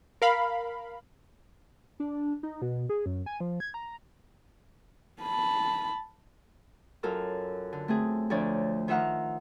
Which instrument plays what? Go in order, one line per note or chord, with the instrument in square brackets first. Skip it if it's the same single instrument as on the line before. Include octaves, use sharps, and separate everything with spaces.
[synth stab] A#4 F5 B5
[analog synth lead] D4
D#4
B2
G#4
F#2
G#5
F3
G#6
A#5
[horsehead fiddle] A5 B5
[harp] F#2 F4 A4 A#4 F6
D3
A3 C4 G#4
D2 F3 D4 C#5 D5
D#3 F4 E5 F#5 A#5 F6